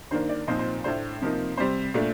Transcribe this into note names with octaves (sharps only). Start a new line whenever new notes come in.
G2 D#3 A#3 D4 C5
D5
A#2 F3 C4 D#4 C5 D#5
C5
A2 A3 D4 C5
C3 F3 A#3 D#4
C3 G3 C4 C5
A#2 A3 D4